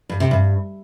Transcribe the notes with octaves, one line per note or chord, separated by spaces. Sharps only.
G2
C3
G2